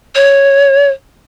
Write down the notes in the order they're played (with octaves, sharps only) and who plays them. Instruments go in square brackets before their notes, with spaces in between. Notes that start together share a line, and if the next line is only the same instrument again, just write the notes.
[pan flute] C#5